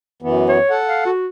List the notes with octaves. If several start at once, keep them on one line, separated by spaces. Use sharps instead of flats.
F#2 E3 B3
C#5
A4 F#5
F5
F#4